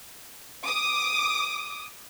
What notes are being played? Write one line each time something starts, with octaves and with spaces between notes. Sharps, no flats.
D6 D#6